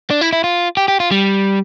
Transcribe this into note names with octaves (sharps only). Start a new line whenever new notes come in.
D4
E4
E4
F4
G4
G4
F4
G3